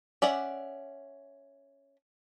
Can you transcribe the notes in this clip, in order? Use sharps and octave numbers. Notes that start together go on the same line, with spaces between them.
C#4 D5 E5 F#5